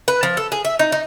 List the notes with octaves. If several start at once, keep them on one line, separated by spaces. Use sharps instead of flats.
B4
F3
A4
G#4
E5
D#4
D#4